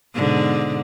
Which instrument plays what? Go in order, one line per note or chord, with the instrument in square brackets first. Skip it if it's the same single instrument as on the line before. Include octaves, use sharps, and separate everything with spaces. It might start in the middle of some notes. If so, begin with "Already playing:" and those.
[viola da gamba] G#2 B2 D3